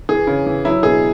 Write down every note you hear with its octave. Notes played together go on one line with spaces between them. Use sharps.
E3 G#4
C#3
E3
F#3 E4
B2 G#4